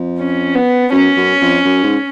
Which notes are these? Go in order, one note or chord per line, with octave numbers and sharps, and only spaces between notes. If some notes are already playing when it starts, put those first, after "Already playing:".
Already playing: F2
C#4
B3
F#2 C#4
F#2
F2
F#2
G#2